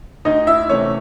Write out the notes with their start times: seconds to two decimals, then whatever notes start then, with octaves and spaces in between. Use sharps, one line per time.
0.25 D2 D#4 D#5
0.47 E4 E5
0.69 C3 E3 A3 C#4 C#5